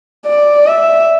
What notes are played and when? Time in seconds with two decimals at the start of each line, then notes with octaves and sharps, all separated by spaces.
0.26 D5
0.67 E5